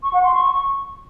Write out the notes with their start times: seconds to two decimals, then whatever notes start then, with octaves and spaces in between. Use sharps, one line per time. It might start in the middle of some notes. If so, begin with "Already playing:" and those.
0.03 C#6
0.13 F#5
0.24 C6
0.34 C#6